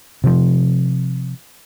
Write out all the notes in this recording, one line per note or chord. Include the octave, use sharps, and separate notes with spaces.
C3 F3